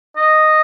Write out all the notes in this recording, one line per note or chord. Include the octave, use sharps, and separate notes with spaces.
D#5